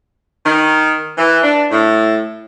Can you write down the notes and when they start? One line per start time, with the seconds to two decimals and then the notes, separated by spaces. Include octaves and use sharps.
0.45 D#3
1.18 E3
1.42 D4
1.70 A2